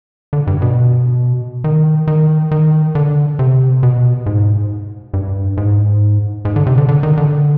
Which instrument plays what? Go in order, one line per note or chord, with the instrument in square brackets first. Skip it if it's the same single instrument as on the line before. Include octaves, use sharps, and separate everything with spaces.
[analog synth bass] D3
G2
B2
D#3
D#3
D#3
D3
C3
B2
G#2
G2
G#2
G#2
D3
C3
D3
D3
D#3
D3